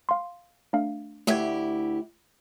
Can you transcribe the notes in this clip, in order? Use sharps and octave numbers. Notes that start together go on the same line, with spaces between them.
F5 C6
A3 D4 F5
D2 A3 E4 G4 G#6